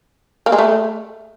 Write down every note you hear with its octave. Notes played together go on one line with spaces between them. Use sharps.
A#3
G#3
A3